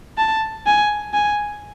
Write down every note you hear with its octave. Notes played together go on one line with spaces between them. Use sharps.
A5
G#5
G#5